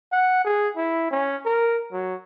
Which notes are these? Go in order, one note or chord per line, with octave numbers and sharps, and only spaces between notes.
F#5
G#4
E4
C#4
A#4
F#3